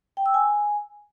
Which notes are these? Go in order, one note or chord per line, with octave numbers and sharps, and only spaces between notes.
G5
E6
G#5